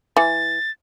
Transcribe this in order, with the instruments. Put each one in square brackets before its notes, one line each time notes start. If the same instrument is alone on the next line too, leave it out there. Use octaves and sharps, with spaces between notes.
[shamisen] E3 [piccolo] A6